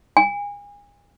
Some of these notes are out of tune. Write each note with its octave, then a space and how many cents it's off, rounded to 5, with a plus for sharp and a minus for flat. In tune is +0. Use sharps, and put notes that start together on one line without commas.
G#5 -35